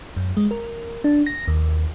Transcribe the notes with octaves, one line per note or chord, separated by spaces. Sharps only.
F#2
G#3
A#4
D4
A#6
D#2